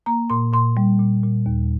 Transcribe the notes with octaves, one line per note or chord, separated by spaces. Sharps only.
A#3 A#5
A#2 C6
A#2 C6
G3
A#2
A#2
D#2